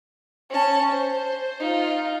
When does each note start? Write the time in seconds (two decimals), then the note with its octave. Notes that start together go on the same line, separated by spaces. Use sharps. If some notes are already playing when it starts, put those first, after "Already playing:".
0.50 C#4 A5
0.92 C5
1.60 D#4 F4